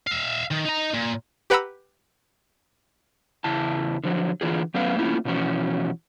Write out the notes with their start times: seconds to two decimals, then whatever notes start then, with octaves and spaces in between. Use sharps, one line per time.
0.07 E5 F5
0.51 D#3
0.65 D#4 A#5
0.94 A#2
1.50 G4 B4 F#5 A#5 B5 E6
3.44 E2 C#3 E4 A5
4.04 D3 F3 F#3
4.41 D3 E3 F4 G#4
4.74 F#3 A3 B3 C#4 B4 F5
4.96 A3 A#3 C#4 E4 F4
5.25 B2 E3 F3 C#4 F#4